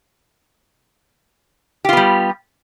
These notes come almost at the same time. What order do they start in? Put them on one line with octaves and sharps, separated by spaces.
G4 F4 B3 G3